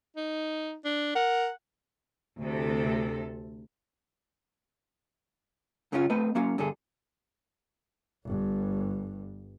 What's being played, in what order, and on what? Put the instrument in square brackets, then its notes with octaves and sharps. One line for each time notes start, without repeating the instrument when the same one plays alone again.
[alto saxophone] D#4
D4
[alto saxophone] A#4 [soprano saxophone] F#5
[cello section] D2 C3 A4
[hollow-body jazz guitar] F#2 C#3 F#3 C#4 D4 F4
A3 C4 B4 D#5
F#3 A#3 C#4 F#4 F5
G2 D3 G#4 A4
[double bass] G1 G2